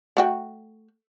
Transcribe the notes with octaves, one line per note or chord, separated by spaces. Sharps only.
A3 F#4 G5